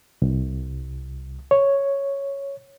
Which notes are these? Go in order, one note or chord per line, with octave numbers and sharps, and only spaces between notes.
C2
C#5